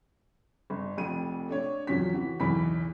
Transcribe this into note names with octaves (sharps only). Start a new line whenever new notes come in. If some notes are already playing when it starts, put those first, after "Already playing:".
G1
F1 F2 D#7
A3 D4 C#5
E2 F3 F#3 C#4 B6
E3 F#4
B1 E2 E3 B5 B6